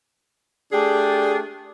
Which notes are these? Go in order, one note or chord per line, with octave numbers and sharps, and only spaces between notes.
A3 D4 G4 G#4